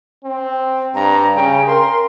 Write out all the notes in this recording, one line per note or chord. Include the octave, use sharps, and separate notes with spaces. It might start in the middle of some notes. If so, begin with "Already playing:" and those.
C4
G2 A#5
C#3 G5
A#4 C6